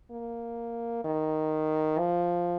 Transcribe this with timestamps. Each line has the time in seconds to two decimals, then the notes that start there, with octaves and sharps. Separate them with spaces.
0.11 A#3
1.04 D#3
1.99 F3